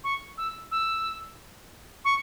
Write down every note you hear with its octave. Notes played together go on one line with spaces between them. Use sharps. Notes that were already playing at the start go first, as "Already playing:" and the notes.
C#6
E6
E6
C#6